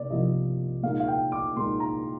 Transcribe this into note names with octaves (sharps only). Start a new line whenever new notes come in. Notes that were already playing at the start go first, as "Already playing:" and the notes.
Already playing: C3 A#3 D5
C3 F3 A#3 F4 D#5
A#2 G#3 D#4 F5
F5
G5
D6
A#2 G#3 D#4 C6
A#5